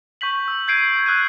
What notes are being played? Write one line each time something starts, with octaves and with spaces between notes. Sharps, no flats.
C#6 G6 B6 F#7
E6
G6 G#6 C7 D7 D#7
E6 F#6 G#6 D#7